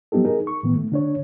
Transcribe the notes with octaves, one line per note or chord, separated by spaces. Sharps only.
F#3 G3 B3 D#4 G4 A4
D#4 G#4 A#4
C#6
A2 D#3 B3
A3
D3 D4 C#5